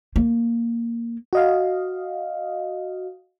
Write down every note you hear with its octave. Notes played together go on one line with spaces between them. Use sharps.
A#3
F#4 D#5 F5